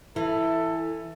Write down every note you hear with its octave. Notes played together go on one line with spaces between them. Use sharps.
E3 E4 A4